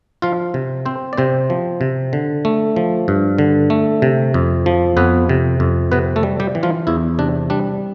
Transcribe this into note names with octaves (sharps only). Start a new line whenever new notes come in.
F3 F4 F5
C3
C4 C5
D5
C3 C4 C5
F3
C3
D3
A3
F3
G2
D3
A3
C3
F2
F3
F2 B3 B4
C3
F2
C3 B3 B4
A3 A4
G3
G3 G4
E3
F3 F4
E2 E4
C3 D4
G3 D4